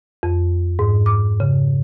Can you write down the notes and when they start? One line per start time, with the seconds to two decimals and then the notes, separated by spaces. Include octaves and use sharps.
0.23 F2
0.79 G#2
1.06 D6
1.40 C#3